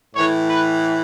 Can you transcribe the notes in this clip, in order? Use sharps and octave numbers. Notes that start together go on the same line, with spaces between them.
A2 E3 C#5
B4